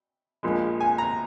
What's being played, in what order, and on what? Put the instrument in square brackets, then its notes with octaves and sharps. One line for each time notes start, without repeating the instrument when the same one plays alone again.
[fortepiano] A#1 A#2 F3 G#3
G#5
A#5